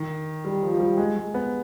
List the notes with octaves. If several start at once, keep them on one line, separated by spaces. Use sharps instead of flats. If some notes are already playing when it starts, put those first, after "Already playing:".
Already playing: D#3
G3
F3
F3
G3
G#3
G#3
B3